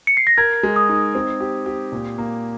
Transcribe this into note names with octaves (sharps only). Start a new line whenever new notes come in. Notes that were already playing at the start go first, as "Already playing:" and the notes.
C#7
C7
A#6
A#4 G#6
G#3
D#6
D#4
C4
G4
G4
A#2
A#3